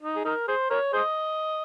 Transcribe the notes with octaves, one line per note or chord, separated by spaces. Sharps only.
D#4
G#4
D#4 A#4
G#4 C5
A#4 C#5
G#4 C5 D#5